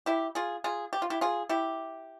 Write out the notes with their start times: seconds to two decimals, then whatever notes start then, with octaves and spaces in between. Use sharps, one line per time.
0.06 E4 G4
0.35 F4 G#4
0.64 F4 G#4
0.93 G4
1.02 F4
1.10 E4 G4
1.21 F4 G#4
1.49 E4 G4